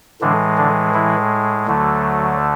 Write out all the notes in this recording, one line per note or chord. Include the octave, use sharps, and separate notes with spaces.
A2 D3 E3 G#3 D4
D3 D4
E3 E4
D2 D3 F#3 A3